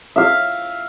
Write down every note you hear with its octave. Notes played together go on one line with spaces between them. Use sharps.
E5 F5